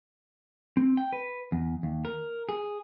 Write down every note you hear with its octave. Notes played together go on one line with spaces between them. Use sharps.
C4
G5
B4
E2
D#2
A#4
G#4